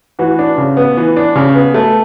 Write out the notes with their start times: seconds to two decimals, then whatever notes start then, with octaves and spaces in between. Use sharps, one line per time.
0.19 E3 F#4
0.39 D4
0.58 C#3
0.77 B3
0.97 E3
1.17 D4
1.36 C#3
1.55 B3
1.74 A3